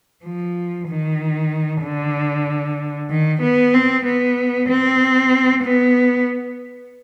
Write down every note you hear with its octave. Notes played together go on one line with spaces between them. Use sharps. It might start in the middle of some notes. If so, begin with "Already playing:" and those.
F3
D#3
D3
D#3
B3
C4
B3
C4
B3